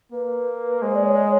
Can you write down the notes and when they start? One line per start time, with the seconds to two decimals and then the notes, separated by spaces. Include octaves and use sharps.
0.12 A#3 B4
0.82 G#3 C5
0.94 D5
1.05 C#5